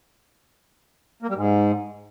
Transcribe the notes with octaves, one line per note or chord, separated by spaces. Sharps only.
A#3
G3
G#2